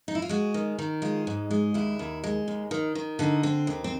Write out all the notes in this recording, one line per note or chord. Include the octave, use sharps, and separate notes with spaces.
D#4
E4
F4
G#3 F#4
D#3
D#3
G#3 F4
G#2
G#3
D#2 E4
D#2
G#3
D#2
D#3
D#3
D3 D#4
C4
D#2
C4